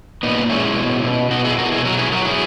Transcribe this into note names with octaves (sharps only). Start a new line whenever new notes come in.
A#2 B3 D#4
G#3 C#4 E4
B2
B2
B2 D#4 F#4
E4 G#4
B2 F#4 A#4
E4 G#4
F#3 F#4 A#4
E4 G#4
F#3 F#4 A#4
E4 G#4